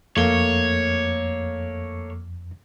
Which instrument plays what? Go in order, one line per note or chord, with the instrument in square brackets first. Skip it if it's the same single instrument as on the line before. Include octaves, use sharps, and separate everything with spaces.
[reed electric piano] F2 [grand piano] A3 A#3 G7 [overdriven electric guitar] C#5